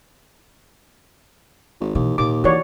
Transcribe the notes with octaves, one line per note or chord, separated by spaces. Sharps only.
G#1
D#2 B2 E3
D#2 A#2 D6
E3 F#4 C#5 D5